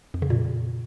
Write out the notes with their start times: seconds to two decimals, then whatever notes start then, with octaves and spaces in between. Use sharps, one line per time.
0.14 F2
0.22 C#3
0.30 A#2